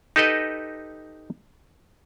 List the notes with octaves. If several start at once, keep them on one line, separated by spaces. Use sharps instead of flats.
D#4 G4 A4 B4 D#5